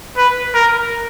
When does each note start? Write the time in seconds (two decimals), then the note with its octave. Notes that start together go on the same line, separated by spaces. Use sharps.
0.17 B4
0.54 A#4